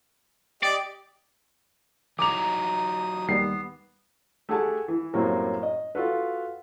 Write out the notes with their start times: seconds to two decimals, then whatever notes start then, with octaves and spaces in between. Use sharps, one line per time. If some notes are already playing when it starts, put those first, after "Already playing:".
0.63 G4 D5 D#5
2.19 E3 F#3 D#4 A#5 D6 D#6 F7
3.29 D#2 D#3 G3 B3 C7
4.49 A3 G4 G#4 F#5 G#5 A5
4.88 E3
5.14 F#2 A2 G3 A#3 C4
5.63 D#5
5.95 F4 F#4 A4 B4